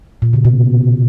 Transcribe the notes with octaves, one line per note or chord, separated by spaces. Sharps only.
A#2
C#3
B2